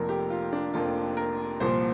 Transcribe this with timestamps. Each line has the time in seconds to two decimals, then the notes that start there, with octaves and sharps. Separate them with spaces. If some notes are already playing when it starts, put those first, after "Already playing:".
Already playing: F1 F2 F3 A#3 A#4
0.09 G4
0.30 F4
0.53 D4
0.74 F1 F2 F3 A#3 F4
1.17 A#4
1.60 C2 A#2 F3 A#3 C5